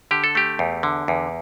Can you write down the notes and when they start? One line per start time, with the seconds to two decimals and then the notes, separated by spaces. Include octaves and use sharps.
0.11 D3 G4
0.24 A4
0.35 A3 G4
0.59 E2
0.83 D3
1.08 E2